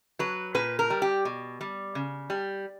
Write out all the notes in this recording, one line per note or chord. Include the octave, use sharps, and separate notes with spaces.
F#3 B4
A#2 B4
A#4
G3
G4
B2
G3
C#3
G3